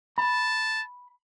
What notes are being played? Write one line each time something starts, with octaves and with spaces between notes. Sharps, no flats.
A5 B5